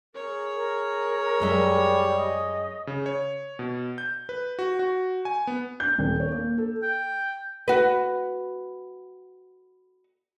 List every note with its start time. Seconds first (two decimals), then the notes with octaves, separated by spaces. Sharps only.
0.15 G#4 A#4 C#5
0.55 A#4
1.40 F#2 G3 G#3 E5
2.15 D#5
2.87 C#3
3.06 C#5
3.59 B2
3.98 G6
4.29 B4
4.59 F#4
4.79 F#4
5.25 G#5
5.47 B3
5.80 G6
5.98 D#1
6.20 C#5
6.32 A#3
6.58 A4
6.83 G5
7.68 F#4 B4